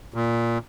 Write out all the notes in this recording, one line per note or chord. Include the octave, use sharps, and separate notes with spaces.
A#2